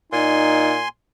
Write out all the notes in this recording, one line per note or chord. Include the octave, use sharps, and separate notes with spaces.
A#2 D#4 G#5 C6